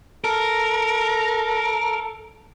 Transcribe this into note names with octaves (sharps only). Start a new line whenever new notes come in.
A4 A#4